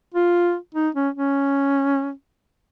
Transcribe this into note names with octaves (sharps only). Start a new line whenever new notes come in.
F4
D#4
C#4
C#4